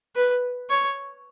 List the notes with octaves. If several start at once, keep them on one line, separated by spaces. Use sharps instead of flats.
B4
C#5